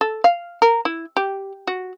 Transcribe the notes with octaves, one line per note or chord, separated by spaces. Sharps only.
A4
F5
A#4
E4
G4
F#4